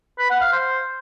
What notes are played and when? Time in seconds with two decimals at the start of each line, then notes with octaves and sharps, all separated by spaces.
0.19 B4
0.30 F#5
0.41 F5
0.53 C5